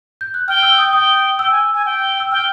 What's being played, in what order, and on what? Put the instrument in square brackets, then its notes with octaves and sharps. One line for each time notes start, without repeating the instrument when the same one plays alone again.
[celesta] G6
F#6
[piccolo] G5 [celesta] F6
[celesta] E6
D#6
[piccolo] G5 [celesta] D#6
[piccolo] G5 [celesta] E6
[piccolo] G#5
G#5
G5
[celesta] E6
[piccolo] G5 [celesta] F6